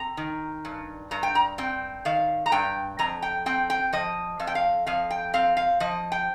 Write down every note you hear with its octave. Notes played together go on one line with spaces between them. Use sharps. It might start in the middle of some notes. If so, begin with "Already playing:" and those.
Already playing: C4 A#5
D#3
G2
G2 A#5
G5
A#5
C4 G5
D#3 F5
A#5
G2 G5
F2 A#5
G5
C4 G5
G5
F3 D#5
F2 F5
G5
F5
F2 F5
G5
C4 F5
F5
F3 D#5
G5